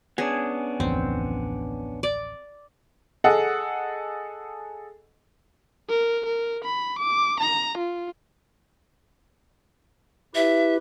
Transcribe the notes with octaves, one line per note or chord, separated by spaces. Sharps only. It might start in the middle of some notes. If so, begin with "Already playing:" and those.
B3 C#4 D4 G#4
D1 A1 F2 C4
D5
G#4 A4 D#5 F#5
A#4
A#4
B5
D6
A#5
F4
E4 G4 B4 E5